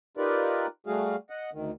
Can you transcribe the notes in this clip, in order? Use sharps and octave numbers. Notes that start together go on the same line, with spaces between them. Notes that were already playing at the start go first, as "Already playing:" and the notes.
D#4 F4 G4 A#4 B4 D5
G3 A3 F#4 G#4 F5
D#5 F#5
D2 D#3